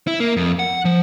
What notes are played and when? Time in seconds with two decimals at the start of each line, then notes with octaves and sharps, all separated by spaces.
0.07 E4
0.20 A#3
0.36 F2
0.59 F#5
0.85 F3